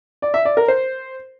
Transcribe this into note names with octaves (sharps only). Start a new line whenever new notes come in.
D5
E5
D5
A#4
C5